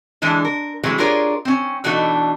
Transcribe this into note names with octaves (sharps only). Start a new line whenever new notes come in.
D3 E3 G#3 D4 A4
A#4
C3 E3 F#3 G#3 A3
D4 F4 G#4 A#4 C#5 D5
C4 C#4
B2 E3 D4 D#4 F#4 A4